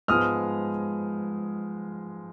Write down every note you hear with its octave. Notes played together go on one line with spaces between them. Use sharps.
G#2 F3 G#3 B3 D#6 F6